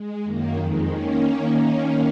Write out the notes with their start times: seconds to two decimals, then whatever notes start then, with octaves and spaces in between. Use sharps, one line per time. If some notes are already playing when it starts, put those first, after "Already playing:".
Already playing: G#3
0.23 F#2 D#3 A#3
0.56 F2 D#3 G#3
0.89 D#3 A#3 C#4